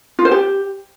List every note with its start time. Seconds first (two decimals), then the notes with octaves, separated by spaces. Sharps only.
0.19 F4
0.25 C5
0.31 G4